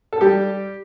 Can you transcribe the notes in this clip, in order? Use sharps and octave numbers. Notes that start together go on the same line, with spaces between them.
A4
G3 G4